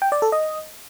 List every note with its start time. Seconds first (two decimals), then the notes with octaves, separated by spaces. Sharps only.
0.02 G5
0.12 D5
0.22 A4
0.32 D#5